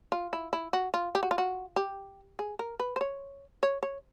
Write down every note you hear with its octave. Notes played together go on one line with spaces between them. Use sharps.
F4
E4
E4
F#4
F4
G4
F#4
F4
F#4
G4
G#4
A#4
B4
C5
C#5
C#5
C#5